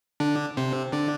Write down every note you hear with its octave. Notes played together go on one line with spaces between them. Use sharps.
D3 D4
C3 C4
D3 D4